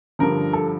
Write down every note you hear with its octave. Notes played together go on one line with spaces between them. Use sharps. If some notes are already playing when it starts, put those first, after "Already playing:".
G2 D3 F3 A#4
A4